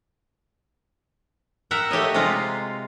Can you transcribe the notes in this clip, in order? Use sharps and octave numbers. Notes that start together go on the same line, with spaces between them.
A#4 E5 F#5 G5
A3 G4 C#5 D#5
C3 G#3 F4 A#5